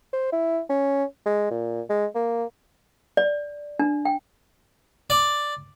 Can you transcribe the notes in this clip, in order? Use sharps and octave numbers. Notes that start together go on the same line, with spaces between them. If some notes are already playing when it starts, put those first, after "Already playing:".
C5
E4
C#4
G#3
A#2
G#3
A#3
D5
D4
G5
D5